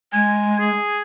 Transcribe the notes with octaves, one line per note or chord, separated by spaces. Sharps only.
G#3 G#5
G#4